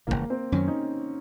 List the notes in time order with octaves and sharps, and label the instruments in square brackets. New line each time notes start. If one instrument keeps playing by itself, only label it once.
[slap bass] E1 D2 C#3 E3 [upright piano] A#3
[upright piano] C4
[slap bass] F#2 D#3 F#3 [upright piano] C#4
[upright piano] D#4